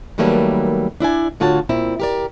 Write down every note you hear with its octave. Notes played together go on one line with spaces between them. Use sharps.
D#3 F#3 G3 A3 A#3 B4
D4 E4 D5 G#5
A2 D3 F4 F#4 C#5 A5
A#2 C4 E4
G4 A#4 D5